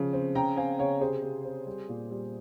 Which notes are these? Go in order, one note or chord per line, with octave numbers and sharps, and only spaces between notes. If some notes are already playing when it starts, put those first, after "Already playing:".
Already playing: C#3 F3
C4
C#3 G5 A#5
C4 F5 G#5
C#3 C#5 F5
C3 G#4 C5
C3
C4
G3
A#2
G3